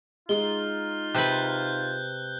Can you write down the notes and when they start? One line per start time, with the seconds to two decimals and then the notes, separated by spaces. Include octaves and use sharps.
0.29 G#3 D#4 F4 G7
1.15 C3 B4 F#6 G6